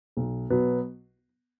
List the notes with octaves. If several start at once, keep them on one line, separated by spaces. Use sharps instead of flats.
B1
B2 F#3 B3